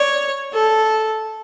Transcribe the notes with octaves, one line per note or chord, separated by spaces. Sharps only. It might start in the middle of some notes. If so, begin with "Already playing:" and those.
Already playing: C#5 D5
A4